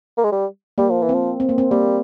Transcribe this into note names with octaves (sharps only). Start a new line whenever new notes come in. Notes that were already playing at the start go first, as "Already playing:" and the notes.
A#3
G#3
G3
G3 A#3
F3
E3
C4
F3
C4
A#3
C4
G3 A#3